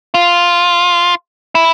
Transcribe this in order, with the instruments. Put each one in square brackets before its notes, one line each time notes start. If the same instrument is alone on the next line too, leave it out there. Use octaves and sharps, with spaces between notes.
[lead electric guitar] F4
E4